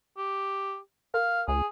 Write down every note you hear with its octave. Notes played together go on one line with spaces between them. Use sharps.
G4
A#4 F5
C#2 G#4